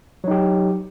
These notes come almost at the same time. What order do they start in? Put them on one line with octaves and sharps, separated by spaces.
F#3 D#4 G4